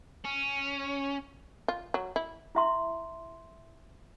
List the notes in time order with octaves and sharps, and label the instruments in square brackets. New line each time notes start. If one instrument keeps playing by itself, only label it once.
[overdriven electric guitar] C#4
[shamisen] F4
F#3
E4
[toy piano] E4 E5 C6